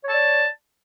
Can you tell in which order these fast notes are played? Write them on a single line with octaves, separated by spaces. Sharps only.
C#5 A5 D5